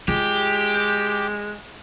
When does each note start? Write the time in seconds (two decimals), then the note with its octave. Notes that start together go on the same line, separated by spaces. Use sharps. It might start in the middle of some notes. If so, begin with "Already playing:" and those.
0.08 G#3 F4 G4